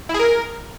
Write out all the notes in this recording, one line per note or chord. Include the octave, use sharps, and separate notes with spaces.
E4
G#4
A#4